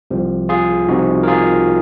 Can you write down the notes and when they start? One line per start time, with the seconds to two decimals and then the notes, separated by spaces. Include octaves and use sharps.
0.11 C2 C3 F3
0.49 F4 G#4
0.88 C2 C3 F3 D#4 F#4
1.23 A#4
1.27 F4 G#4